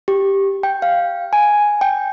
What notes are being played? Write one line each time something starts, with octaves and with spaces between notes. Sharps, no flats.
G4
G5
F5
G#5
G5